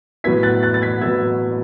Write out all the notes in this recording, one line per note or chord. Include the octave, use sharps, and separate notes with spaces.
A2 F#3 B3 E4 G#6 B6
F#6 A6
F#6 A6
A6
G#6 B6
A2 F#3 B3 E4 E6 G#6